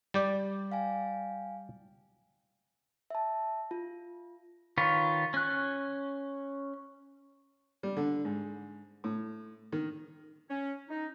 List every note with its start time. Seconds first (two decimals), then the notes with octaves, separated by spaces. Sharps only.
0.14 G3 G4 D5 A6
0.72 F5 G5 G#5
3.10 E5 A5
3.71 F4
4.78 D#3 F4 B4 C#5
5.34 C#4 F#6
7.83 G3
7.97 D3
8.25 G#2
9.04 A2
9.72 D#3
10.49 C#4
10.89 D#4